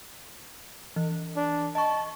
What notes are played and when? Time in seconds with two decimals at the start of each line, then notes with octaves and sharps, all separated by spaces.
0.96 E3
1.37 D4
1.75 D#5 A5 C#6